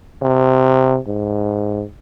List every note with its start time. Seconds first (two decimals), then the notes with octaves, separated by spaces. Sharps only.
0.22 C3
1.07 G#2